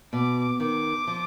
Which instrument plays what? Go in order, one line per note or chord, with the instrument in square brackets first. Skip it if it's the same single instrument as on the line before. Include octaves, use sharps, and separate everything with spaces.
[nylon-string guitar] B2 [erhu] D6
[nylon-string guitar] D#3 [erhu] D6
[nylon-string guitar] F3